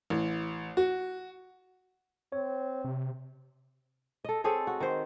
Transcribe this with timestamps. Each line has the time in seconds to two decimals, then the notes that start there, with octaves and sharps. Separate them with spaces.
0.10 A1
0.77 F#4
2.32 C4 C#5
2.84 C3
4.24 A4 D#5
4.44 C4 G#4 A4 C#5
4.67 F#4
4.80 D#3 C5